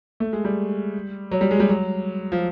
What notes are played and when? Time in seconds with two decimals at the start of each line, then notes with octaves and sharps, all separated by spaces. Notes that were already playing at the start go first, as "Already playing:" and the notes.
0.20 A3
0.33 G#3
0.45 G3
1.31 F#3
1.41 G3
1.51 G#3
1.60 G3
1.69 F#3
2.32 F3